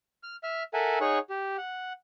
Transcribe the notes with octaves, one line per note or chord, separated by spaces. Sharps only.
F6
E5 F6
A4 A#4 E5 F#5 G#5
D#4 G#4 C#5 F#5 C#6
G4
F#5